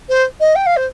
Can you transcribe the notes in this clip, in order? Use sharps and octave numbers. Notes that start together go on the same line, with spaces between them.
C5
D#5
G5
F5
C5